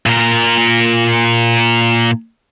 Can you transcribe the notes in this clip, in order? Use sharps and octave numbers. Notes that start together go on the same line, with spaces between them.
A#2 A#4